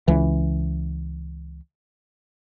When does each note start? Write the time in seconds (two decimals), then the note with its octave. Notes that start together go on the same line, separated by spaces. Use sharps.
0.08 C#2 E3